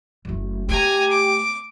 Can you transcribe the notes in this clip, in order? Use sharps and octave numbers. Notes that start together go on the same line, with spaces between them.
F#1 A3
A3 G4 G#5 A#5
D6